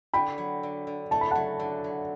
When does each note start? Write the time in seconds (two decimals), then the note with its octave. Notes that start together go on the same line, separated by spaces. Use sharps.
0.14 D3 G5 B5
0.38 F#3
0.63 D3
0.87 D3
1.11 A3 A5
1.21 B5
1.31 F#3 F#5 A5
1.60 D3
1.84 F#3